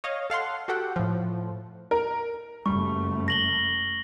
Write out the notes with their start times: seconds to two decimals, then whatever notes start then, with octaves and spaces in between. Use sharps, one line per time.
0.04 C#5 D#5 F5
0.30 A4 F5 F#5 C6
0.68 F#4 G4 A4 F#5 G5
0.96 A2 F3
1.91 A#4
2.66 F#1 G3 A3 C#6
3.28 A#6 F#7 G7